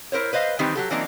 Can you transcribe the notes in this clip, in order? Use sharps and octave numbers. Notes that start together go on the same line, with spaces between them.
E4 A#4 C5 C#5
B4 C5 D#5 F5
D#3 E3 G3 C4 D#4 G4
F#3 G4 A4
E3 F#3 A#3 C4 D4 D#4